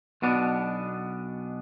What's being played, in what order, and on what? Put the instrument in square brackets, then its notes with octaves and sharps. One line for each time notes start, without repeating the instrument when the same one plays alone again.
[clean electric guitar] B1 B2 B3 D4